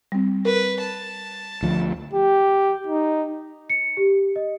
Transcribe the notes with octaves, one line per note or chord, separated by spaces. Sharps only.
G3 C4
A#4 B4
A5
D2 F3
G4
D#4
C#7
G4
D#5